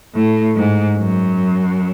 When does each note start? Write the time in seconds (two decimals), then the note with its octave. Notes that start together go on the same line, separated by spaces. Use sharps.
0.14 A2
0.56 G#2
0.97 F#2